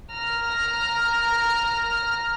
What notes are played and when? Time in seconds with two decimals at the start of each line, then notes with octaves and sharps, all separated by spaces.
0.13 A#5 F6